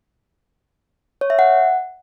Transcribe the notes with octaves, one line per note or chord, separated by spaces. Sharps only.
C#5
E5
F#5